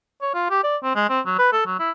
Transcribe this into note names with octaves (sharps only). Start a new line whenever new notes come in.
C#5
F4
G4
D5
C4
G#3
C4
F#3
B4
A4
F#3
E4